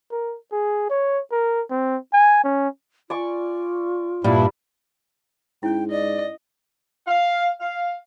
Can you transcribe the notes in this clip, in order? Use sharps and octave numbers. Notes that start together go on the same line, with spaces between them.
A#4
G#4
C#5
A#4
C4
G#5
C#4
F4 D5 G#5 C#6
G2 A#2 G3 D4 E4
G#2 C#4 E4 G5
D5 D#5
F5
F5